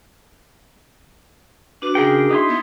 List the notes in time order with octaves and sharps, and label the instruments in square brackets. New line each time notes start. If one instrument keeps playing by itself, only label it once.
[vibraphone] D4 F#4 [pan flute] B4
[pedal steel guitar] C#3 A#4 G5 [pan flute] G#4
[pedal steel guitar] D#4 E4 C6
[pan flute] B3